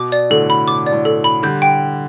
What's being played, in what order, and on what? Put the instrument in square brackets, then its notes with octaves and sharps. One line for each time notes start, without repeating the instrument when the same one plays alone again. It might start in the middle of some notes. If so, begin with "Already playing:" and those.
Already playing: [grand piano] B2 [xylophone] D6
[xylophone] D5
[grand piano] A2 D3 [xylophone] A4
[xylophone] B5
[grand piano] B2 [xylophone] D6
[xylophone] D5
[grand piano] A2
[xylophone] A4
B5
[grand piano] D3 G3 [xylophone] G6
[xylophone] G5